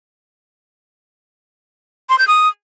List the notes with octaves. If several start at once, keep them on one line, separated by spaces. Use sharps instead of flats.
C6
G6
D#6